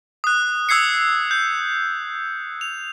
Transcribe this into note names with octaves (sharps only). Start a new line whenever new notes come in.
D#6 F#6
D#6 E6 G#6 C7 C#7
G6
F7